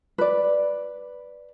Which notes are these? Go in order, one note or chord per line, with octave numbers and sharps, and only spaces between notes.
B4 D5